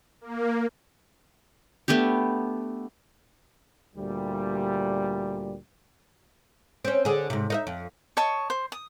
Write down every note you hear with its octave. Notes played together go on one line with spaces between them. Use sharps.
A#3
A3 B3 D4 G4
D2 A#2 G3
C4 C#4
D3 G#4
G#2 C3
D#4 A#4 E5
F2
C#5 D#5 A5 C#6
C5
D#6